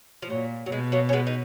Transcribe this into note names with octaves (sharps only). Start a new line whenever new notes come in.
F3
A#2 F#3
F#3
B2 G#3
F#3 A#3
C#4
G#3 B3
D#4